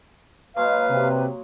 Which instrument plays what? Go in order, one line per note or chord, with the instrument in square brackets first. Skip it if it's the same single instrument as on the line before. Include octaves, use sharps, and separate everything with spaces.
[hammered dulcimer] F#3 G#3 A#3 [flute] B4 [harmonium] F5
[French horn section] C3